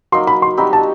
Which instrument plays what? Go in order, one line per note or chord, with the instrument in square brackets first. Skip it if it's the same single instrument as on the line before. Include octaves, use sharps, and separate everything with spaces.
[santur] F#3 A#3 D#4 [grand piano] C6
[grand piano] B5
C6
[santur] G3 C4 D#4 F#4 [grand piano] B5
[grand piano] A5